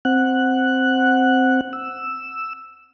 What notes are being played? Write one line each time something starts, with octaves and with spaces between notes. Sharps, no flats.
C4 F#5 F#6
E6